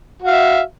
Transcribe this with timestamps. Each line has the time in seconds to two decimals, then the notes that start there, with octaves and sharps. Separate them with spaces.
0.22 F#4
0.27 F5
0.32 E5